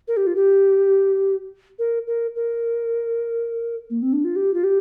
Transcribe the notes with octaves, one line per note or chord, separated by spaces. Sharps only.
A#4
G4
F4
G4
A#4
A#4
A#4
A#3
C4
D4
F4
G4
F4
G4